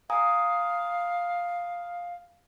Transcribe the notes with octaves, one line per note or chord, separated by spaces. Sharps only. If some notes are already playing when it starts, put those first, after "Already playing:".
F5 G#5 A#5 D#6